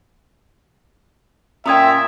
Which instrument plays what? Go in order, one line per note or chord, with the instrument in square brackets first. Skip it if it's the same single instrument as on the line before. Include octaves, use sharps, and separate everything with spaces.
[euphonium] A#2 [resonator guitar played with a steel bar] C#4 F4 G5 [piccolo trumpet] E5 [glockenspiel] A#5 D#6 G#6